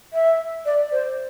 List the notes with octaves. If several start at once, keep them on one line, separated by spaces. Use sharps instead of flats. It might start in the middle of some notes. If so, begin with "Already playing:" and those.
E5
D5
C5